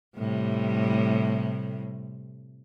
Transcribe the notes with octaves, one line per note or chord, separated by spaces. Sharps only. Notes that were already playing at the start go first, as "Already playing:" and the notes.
A2 C3 G3